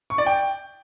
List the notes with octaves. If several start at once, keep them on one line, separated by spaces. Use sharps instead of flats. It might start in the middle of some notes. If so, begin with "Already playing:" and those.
C#6
D5
G5